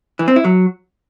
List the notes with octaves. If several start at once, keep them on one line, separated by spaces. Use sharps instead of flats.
E3
C4
E4
F#3